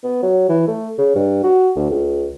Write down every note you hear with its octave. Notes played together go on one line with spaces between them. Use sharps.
B3
F#3
E3
A3
C#3
G2
F#4
D2
C#2